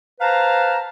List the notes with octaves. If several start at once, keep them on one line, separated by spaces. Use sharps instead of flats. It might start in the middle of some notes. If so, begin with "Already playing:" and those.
B4 C5 F5 A5 A#5